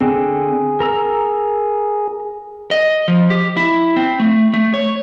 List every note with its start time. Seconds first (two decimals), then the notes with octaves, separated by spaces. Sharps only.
0.01 D3 C4 G#4
0.80 A#4 A#5 E6
2.71 D#5
3.08 F3
3.30 G4
3.57 E4
3.96 C4
4.20 A3
4.54 A3
4.74 C#5